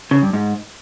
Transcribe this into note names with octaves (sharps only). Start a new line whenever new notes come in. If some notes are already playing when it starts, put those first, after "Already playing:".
C#3
G2
G#2